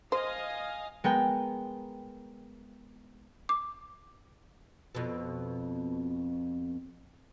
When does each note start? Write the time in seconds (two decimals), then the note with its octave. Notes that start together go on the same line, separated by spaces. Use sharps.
0.12 C5 D#5 F5 G#5
1.04 G#3 B3 A#4 G5
3.49 D6
4.95 F2 B2